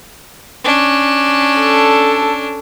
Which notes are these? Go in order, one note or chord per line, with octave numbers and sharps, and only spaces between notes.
C#4 D4
A4